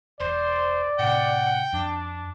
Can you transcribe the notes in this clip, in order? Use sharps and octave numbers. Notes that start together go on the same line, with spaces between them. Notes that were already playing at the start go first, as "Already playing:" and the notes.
E1 C5 D5
A2 C3 F#5 G5
F2 D4